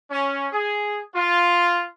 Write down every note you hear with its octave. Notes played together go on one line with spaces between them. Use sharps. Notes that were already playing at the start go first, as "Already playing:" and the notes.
C#4
G#4
F4